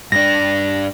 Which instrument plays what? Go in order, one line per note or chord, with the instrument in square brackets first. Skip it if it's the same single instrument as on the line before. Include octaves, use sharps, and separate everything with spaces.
[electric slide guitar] G2 D4 [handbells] A#6